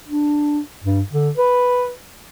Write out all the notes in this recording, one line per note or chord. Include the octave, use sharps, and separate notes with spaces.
D4
G2
D3
B4